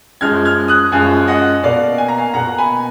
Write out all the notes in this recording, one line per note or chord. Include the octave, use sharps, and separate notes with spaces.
F#2 F3 G#3 F6 G#6
F6 G#6
D#6 F#6
F#2 F3 G#3 F5 G#5
D#5 F#5
B2 A#3 D5 F5
G#5
A#5
F5 G#5
B2 A#3 F#5 A#5
G#5 B5